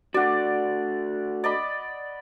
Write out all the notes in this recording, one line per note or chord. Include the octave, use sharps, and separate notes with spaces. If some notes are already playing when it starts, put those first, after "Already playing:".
A3 D4 F#4 D5 F#5
D5 D#5 B5